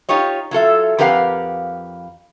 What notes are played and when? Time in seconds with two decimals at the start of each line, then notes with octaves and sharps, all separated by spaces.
0.09 D#4 F4 G4 C#5 D#5
0.51 F#3 F4 A4 E5
0.99 F2 G4 A#4 B4 F5 F#5